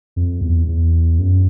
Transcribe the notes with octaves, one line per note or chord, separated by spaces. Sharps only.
F2
E2
E2
F#2